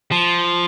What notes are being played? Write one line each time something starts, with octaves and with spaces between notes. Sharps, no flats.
F3